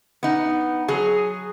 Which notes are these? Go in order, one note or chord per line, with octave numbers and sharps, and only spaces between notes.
B3 D#4
F#3 G#4